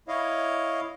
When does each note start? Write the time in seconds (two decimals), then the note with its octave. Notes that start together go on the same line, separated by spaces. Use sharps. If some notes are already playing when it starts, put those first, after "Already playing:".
0.08 E4 C#5 D#5 F5